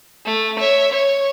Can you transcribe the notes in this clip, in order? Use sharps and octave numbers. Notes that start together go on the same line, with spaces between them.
A3
C#5 E5
C#5